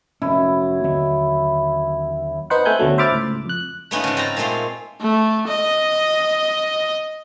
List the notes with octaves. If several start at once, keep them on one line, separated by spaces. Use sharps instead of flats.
F1 F#2 C#4 E4
D#2 D3 F#3 E5
B3 D#4 B4 C5 F#5
A3 C4 E5 G#5 F#6 G6
D2 B2 D3 F#3 A3
C5 E5 B5 D6 F6 A6
C#2 A2
F2 F#6
A3 B3 C#4 D#4 F4
G#2 C#3
C4 A5 A#5
A#2 G#3 A3 F4 F5
A3
D#5